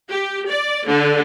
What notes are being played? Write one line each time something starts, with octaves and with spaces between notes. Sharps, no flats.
G4
D5
D3